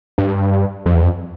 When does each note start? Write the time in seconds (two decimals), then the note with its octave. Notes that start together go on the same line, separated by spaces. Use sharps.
0.18 G2
0.86 F2
0.94 E2
1.03 F2